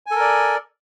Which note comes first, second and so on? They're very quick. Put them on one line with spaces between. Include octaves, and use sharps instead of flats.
G#5 A4 A#4 D5